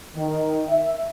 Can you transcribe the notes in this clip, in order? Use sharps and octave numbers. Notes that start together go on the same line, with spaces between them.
D#3
E5